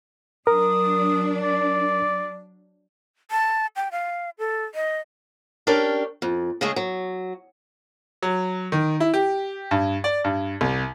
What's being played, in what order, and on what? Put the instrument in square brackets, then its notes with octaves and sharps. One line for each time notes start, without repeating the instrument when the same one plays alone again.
[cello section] F#3 D4 [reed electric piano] A#4 [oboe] D#6
[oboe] D5
[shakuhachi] A5
G5
F5
A4
D#5
[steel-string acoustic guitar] C#4 D4 G4 A4 A#4
F2
C#3 G#3 A3 G#4
F#3
[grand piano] F#3
D#3
E4
G4
G2
D5
G2
C2